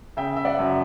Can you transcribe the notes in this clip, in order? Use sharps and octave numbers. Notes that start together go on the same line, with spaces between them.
C#3 E5 G5
E5
D5 F#5
F#2